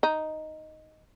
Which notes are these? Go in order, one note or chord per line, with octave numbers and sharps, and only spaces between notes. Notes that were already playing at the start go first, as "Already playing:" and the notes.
D#4